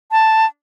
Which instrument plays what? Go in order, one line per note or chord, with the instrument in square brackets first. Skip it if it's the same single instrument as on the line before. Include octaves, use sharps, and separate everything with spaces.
[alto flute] A5